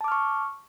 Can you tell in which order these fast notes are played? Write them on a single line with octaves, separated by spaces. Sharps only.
A5 D6 F6 C#6